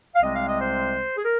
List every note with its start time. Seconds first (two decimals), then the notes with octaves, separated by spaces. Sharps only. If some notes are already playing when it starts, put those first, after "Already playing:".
0.15 F5
0.22 C2 C3 G#3 C4 D#5
0.35 F5
0.48 D#5
0.60 C5
1.18 G#4
1.24 A#4